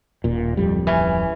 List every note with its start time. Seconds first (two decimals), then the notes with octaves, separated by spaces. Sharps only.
0.24 D#1 A#2
0.57 D1 F2 G3
0.87 E3 C#4